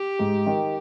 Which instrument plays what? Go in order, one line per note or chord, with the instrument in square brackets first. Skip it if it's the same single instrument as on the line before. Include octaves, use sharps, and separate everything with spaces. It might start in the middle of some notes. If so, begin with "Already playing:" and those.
Already playing: [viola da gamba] G4
[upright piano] G#2
D#3